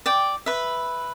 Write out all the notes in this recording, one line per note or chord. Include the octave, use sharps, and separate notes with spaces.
D5 G5
B4 E5